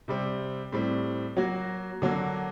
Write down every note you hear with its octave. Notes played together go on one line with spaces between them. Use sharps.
C3 G3 C4
A2 G3 C4
F#3 A#3 F#4
D3 F#3 A#3